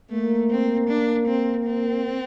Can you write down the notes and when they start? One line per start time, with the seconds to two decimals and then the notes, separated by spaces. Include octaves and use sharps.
0.10 A3 A#3
0.50 C4
0.89 D4
1.27 C4
1.66 C4